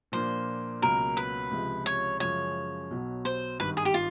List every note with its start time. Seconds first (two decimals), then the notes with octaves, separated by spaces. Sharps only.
0.12 A#2 F3 A#3 D4 C5
0.82 C#2 B2 F#3 A#3 A#4
1.17 B4
1.51 C#2 C3 F3 G#3
1.86 C#5
2.20 F#2 C#3 F3 G#3 C#5
2.91 B1 B2 F#3
3.25 C5
3.59 G#1 G2 D#3 B4
3.77 G#4
3.85 G4
3.94 F4